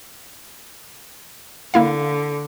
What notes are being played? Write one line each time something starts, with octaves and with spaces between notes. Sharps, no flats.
D3 A#3 E4 F5